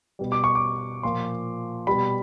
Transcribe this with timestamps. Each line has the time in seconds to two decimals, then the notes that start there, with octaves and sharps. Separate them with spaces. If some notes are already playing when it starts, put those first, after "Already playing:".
0.19 B2 G3
0.32 D6
0.44 C#6
0.55 D6
1.03 A#2 F3 C6
1.87 B2 G3 B5